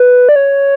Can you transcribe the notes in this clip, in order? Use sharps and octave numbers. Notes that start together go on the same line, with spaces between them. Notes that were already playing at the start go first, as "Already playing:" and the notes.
Already playing: B4
D5
C#5